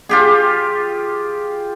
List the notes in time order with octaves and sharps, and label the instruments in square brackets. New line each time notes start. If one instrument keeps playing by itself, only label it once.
[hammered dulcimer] F4 G4 G#4